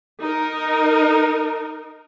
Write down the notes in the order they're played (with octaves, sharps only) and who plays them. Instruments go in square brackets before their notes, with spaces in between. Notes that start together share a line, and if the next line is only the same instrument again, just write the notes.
[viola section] D#4 A#4